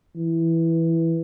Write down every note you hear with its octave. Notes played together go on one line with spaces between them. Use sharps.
E3